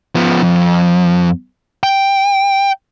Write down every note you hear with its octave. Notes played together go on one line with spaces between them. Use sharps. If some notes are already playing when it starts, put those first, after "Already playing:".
F3 B3
F2
G5